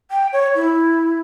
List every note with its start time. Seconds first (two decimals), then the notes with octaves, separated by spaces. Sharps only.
0.11 G5
0.33 C#5
0.55 E4